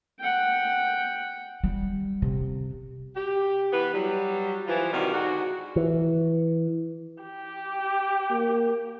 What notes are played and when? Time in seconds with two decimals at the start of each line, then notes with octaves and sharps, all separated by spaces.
0.20 F#5 G5
1.64 G3
2.22 C3
3.16 G4
3.72 E3 B3 B4
3.94 F#3 G3
4.67 E3 F3
4.93 C3 D#3 G3 F4 F#4
5.13 G#2 D3 F#4
5.76 E3
7.22 G4
8.31 A#3